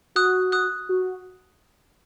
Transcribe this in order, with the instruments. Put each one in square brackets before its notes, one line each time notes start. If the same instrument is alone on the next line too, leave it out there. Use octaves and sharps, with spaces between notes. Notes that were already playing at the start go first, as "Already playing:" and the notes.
[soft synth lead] F#4 [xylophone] D#6 F#6
[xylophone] D#6 F#6
[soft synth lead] F#4